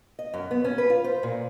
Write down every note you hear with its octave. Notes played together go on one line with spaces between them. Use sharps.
D#5
F#2
B3
C#4
B4
F4
C5
A#2